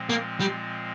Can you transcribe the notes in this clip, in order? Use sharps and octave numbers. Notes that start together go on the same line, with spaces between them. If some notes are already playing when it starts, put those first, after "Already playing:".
Already playing: A#2 F3 G#3 C4
A#3
G3